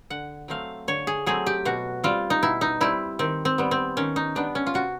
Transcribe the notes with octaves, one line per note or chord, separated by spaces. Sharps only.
D3 F#5
F#3 A3 C4 F5
D3 C#5
G#4
F#3 A3 C4 G#4
G4
B2 F#4
G3 C4 F4
D#4
B2 E4
D#4
G3 C4 E4
D#3 C4
C4
G3 B3
C4
D#3 C#4
D#4
G3 B3 D4
C#4
F4
C3 F#4